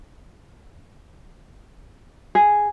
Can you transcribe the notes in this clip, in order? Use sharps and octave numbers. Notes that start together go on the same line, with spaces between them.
G#4